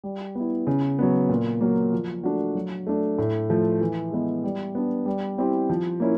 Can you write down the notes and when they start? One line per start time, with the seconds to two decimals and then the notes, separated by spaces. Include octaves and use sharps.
0.04 G3
0.35 B3 E4
0.67 C#3
0.99 F#3 B3
1.29 A#2
1.61 F#3 A#3
1.92 F3
2.24 A3 D4 F#4
2.55 F#3
2.87 A3 D4
3.18 A2
3.50 F3 A3
3.81 E3
4.11 G#3 B3
4.44 G3
4.75 B3 D4
5.06 G3
5.38 C4 E4 G4
5.69 F3
6.00 A#3 C#4 E4